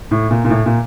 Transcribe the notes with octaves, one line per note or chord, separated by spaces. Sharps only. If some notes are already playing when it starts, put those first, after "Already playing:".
A2
A#2
A#2
A2
A#2